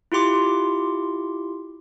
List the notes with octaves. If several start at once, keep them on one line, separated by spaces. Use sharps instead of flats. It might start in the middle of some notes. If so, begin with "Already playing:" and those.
E4 F4 G4 C6 D6